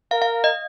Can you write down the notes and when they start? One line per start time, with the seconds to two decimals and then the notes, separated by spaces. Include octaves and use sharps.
0.11 A#4 F5
0.22 F5
0.44 D#5